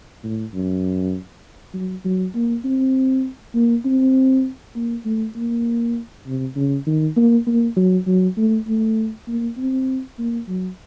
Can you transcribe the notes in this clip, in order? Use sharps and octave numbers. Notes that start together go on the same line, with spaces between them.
A2
F#2
F#3
F#3
A#3
C4
A#3
C4
A#3
A3
A#3
C3
C#3
D#3
A#3
A#3
F#3
F#3
A3
A3
A#3
C4
A#3
F#3